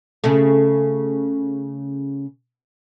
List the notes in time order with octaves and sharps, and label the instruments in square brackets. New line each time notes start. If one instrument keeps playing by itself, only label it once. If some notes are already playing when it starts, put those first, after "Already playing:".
[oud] C#3 A3